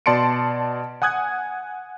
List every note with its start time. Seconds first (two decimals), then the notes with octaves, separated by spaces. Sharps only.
0.06 B2 D5 A5 C6 C#7 D7
1.02 F#5 G#5 D#6 F#6 G#6